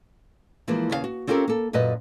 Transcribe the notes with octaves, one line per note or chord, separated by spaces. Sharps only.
E3 F3 G#3 A#3
D#2 C#3 A#4 F5
F#4
C4 C#4 F4 G4 A4 A#4
A#3 A4
F#2 A#2 B4 D#5